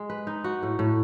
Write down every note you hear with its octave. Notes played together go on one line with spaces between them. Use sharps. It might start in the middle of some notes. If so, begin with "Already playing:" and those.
Already playing: G#3
B4
D#4
F#4
A2
A2